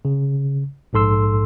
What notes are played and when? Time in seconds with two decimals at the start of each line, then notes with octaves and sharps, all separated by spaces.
0.05 C#3
0.93 A#1 G#2 A4 C6 E6